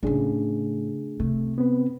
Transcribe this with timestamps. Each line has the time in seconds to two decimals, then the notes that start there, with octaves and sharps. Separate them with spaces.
0.03 A2 C#3 A3 D4 G#4
1.20 C3 A3
1.58 B3 C4 B4